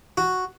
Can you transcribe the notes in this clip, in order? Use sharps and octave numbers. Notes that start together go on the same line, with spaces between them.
F#4